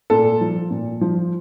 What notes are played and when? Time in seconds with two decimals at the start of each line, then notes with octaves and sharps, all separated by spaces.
0.10 A#2 A4
0.41 F3
0.71 A#2
1.01 F3